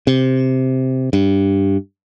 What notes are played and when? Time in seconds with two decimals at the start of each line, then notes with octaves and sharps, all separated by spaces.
0.07 C3
1.13 G2